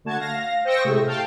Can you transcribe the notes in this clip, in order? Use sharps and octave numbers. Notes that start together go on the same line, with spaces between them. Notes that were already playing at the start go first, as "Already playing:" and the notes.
D3 A3 F#4 A5 G#6
F5 A#6
C5 D#5 G5 C#6 E6 A#6
A2 C3 G#3 A3
F5 G5 A5